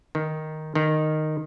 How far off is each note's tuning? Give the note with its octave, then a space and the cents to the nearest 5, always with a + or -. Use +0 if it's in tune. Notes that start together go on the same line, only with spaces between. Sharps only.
D#3 +0
D#3 -10